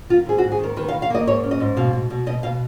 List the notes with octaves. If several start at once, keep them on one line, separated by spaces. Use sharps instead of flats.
D#3 F4
G#2 G#4
F#4
G#2
G#4
D#3 A#4
D#3 B4
F5
D#3
F5
A#3 D#5
G#2 C#5
C#4
D#5
G#2
B2 F5
B2
B2
B2 D#5
B2 F5